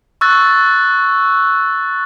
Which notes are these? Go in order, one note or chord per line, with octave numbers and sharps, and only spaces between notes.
C#6 E6 F#6 A6